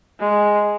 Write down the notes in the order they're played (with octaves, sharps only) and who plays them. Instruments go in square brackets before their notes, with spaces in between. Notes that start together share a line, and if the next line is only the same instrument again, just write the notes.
[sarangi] G#3